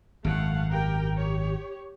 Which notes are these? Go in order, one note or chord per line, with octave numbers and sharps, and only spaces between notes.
G#1 F#2 A3 F5 F#5
G4 A#4 G5
G4 C#5